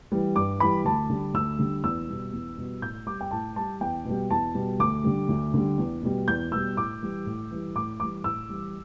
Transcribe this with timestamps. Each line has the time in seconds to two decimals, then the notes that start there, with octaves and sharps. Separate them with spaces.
0.12 E3 G3
0.36 G2 D6
0.60 E3 G3 B5
0.85 D2 A5
1.09 D3 G3
1.34 D2 E6
1.59 D3 G3
1.83 E2 E6
2.08 B2 G3
2.33 E2
2.58 B2 G3
2.82 A2 G6
3.06 G3 D6
3.21 G5
3.31 A2 A5
3.56 G3 A5
3.81 E2 G5
4.05 B2 G3
4.30 E2 A5
4.55 B2 G3
4.80 D2 D6
5.04 D3 G3
5.29 D2
5.54 D3 G3
5.78 E2
6.03 B2 G3
6.28 E2 G6
6.52 B2 G3 E6
6.76 A2 D6
7.02 E3 G3
7.26 A2
7.51 E3 G3
7.75 A2 D6
8.00 E3 G3 D6
8.24 A2 E6
8.50 E3 G3